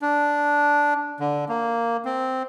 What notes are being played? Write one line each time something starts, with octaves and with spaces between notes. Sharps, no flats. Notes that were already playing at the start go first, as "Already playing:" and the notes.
D4
D3
A#3
C4